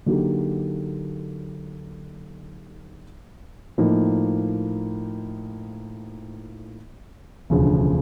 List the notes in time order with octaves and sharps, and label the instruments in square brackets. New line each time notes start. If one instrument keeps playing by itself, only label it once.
[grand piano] D3 F#3 A#3 D#4 G4
A2 F3 A#3 D#4
E1 D2 C#3 F3